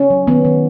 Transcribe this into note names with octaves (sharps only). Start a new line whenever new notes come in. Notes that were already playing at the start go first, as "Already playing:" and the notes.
Already playing: C#4
F#3
D#3 B3
D#3